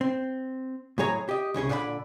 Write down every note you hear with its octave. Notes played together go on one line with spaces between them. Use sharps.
C4
A2 F#3 G#4 C#5 A#5
G4 D#5
C2 C#3 C#4 G#4
A#2 D3 D5 F#5 B5